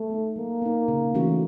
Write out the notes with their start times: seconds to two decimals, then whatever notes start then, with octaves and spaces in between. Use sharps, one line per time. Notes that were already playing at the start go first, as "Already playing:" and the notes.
Already playing: A3
0.10 B3 D#4
0.36 F#3 A#3
0.62 B3 D#4
0.88 C#3
1.15 E3 A3 C#4 F#4